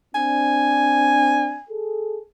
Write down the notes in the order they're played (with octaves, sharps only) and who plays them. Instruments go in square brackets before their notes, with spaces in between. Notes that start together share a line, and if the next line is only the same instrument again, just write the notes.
[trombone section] C4 D4 [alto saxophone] G#5
[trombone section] G#4 A4